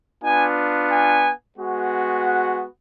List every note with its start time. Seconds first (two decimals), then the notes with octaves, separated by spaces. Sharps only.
0.24 B3 D4 F4 G#5
0.91 G#5
1.57 G#3 B3 F#4
2.25 F#5